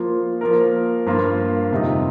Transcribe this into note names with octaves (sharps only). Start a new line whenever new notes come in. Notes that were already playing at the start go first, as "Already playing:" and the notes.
Already playing: F3 A#3 F4
F3 A#3 F4 A#4
G2 F3 A#3 F4
F2 C3 G3 D#4